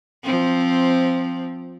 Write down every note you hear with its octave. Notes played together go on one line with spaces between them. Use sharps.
F3 C4